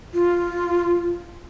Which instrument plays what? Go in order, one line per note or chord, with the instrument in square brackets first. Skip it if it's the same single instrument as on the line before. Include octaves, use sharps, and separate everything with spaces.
[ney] F4